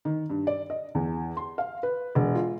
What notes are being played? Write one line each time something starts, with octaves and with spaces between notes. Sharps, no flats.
D#3
G2
D5
D#5
E2
C6
F5
B4
E1
F4